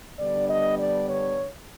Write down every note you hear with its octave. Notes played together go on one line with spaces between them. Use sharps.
D3 G3 B3 D4 D5
D#5
D5
C#5